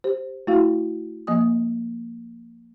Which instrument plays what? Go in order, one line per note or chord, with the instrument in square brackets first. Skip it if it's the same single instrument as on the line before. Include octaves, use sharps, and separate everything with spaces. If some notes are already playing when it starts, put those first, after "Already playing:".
[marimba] G4 C5
A3 E4 F#4 F5
F3 A#3 D#5 G#5 D#6